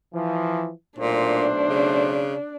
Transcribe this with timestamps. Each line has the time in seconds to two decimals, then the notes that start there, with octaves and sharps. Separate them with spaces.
0.14 E3 F3
0.98 B1 A#2 A3 D4 C5
1.69 C#3